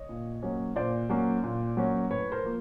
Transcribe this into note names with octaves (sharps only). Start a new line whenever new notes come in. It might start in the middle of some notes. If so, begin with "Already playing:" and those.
Already playing: C#5 D#5
A#2
F#3 A#3 C#4
A#2 C5 D5
F#3 A#3 C#4
A#2
F#3 A#3 C#4
A2 B4 C#5
A#4 C5
F3 A#3